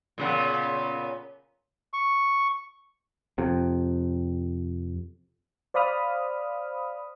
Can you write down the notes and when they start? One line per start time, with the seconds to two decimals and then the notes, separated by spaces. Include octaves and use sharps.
0.18 A#2 C#3 B3
1.93 C#6
3.38 F2 C3
5.74 C5 D5 F5 B5 D#6 F6